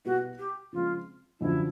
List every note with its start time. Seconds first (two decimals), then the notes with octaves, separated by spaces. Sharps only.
0.05 B2 G3 B3 E4 F#4
0.38 G4
0.73 C#3 F3 G#3 C4 F4
1.40 F#2 D3 F3 E4